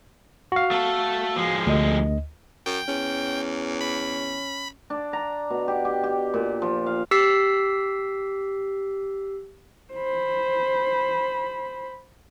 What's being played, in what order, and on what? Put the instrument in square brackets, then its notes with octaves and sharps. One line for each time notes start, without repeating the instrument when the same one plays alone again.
[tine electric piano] F#4 F5
[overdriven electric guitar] A3 A4
F3 G#3
[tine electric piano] D2 D#5
[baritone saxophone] F#2 [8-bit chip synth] G5
[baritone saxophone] E2 [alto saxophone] C#4
[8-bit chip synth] B5
[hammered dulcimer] D4
A#5
B2
G4
G4
G4
A#2
F3
F5
[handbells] G4 E6 B6 C7
[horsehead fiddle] C5 B5